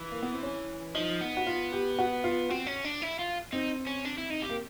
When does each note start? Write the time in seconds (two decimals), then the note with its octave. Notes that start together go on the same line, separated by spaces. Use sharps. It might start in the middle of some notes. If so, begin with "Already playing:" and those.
Already playing: E3
0.12 A#3
0.23 B3
0.32 C4
0.43 C#4
0.95 F3 D#4
1.21 B3
1.37 F#4
1.47 F4
1.72 G4
1.99 F#4
2.24 F4
2.50 C4 F#4
2.67 C#4
2.85 D4
3.02 E4
3.19 F4
3.53 C4 D#4
3.87 C#4
4.05 D4
4.18 E4
4.30 D#4
4.43 G4
4.50 A#3